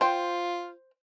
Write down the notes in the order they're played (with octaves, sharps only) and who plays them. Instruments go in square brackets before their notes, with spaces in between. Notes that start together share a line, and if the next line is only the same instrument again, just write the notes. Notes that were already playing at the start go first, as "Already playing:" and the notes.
[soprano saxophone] F4 [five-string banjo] C5 G5